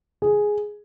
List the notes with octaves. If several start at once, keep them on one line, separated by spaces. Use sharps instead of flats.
G#4